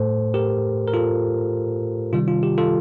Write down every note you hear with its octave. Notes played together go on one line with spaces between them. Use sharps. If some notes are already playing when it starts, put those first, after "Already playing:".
Already playing: A2 A3 A4 C5
G4 A#4
A#4
F4 A4
C3 D#3 G3 F4
F4
G4
F4 A4